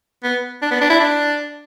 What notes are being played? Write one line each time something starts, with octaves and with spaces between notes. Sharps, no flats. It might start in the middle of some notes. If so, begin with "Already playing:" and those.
B3
D4
B3
D4
E4
D4